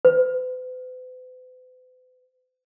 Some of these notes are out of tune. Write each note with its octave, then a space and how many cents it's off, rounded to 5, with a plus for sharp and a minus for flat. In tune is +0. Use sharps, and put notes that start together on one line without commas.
B4 +45